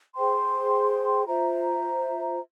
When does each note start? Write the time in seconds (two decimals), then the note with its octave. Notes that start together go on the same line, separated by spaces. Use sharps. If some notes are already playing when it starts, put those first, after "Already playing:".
0.15 G#4 C5 G5 C6
1.27 F4 C5 E5 A#5